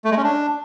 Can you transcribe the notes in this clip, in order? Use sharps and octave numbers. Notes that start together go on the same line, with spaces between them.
A3
G#3
C#4
D4